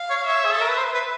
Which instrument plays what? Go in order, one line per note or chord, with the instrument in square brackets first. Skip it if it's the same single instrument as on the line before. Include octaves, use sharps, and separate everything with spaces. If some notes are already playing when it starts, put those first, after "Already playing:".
Already playing: [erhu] F5
[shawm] C#5
[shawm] C#5 [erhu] E5
[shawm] G#4
A4
A#4
B4
C5
B4